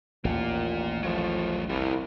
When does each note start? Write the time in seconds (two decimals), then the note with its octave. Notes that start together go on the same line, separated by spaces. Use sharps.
0.25 A1 D#2 A#2 A#3 F4
1.03 F3 F#3 A3
1.70 C2 E4 G4